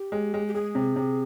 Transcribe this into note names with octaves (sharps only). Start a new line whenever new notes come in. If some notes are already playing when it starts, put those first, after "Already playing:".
Already playing: G4
G#3
G#3
G4
G#3 G#4
C3
C3